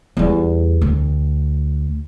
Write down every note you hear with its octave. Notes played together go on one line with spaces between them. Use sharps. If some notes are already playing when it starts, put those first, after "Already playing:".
E2 G3
D2